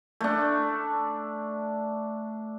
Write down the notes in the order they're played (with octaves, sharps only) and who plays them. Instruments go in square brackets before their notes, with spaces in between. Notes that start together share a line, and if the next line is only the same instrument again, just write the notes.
[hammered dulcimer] A3 D4